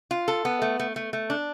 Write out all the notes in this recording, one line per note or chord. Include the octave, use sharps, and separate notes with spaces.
F4
A4
B3
A3
A3
A3
A3
D4